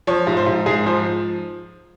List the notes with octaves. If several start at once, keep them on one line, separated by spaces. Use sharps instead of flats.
F3 C#5
G#2
C5
G#2
G#2 G#4
F3 C5